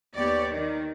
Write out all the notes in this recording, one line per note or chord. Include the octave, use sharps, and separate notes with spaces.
D#2 B3 G4 C#5 D5
D#3